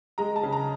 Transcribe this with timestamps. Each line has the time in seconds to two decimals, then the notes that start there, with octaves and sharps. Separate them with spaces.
0.18 G#3 A#5
0.36 A5
0.43 C#3
0.52 A#5